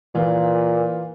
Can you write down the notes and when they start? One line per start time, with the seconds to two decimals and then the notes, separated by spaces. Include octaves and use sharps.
0.15 A#2 E3 F4